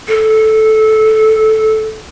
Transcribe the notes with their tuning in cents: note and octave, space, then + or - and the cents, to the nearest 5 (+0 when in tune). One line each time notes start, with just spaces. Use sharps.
A4 -10